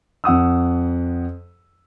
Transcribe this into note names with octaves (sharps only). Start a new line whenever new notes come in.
F2 F#5 D#6 E6